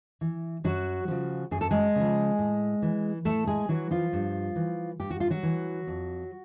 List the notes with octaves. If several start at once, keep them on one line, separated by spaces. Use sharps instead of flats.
E3
F#2 F#3 F#4
C#3 F3
F#2 G#4
A4
G#3 G#4
C#3 F3
A2
E3
A2 A3 A4
G#3 G#4
E3 F#3 F#4
F3 F4
G2
E3
G2 G4
F#4
F4
F#3 F#4
E3
F2